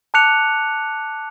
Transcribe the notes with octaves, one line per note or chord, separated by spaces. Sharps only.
A5 D6 F#6 C#7 F7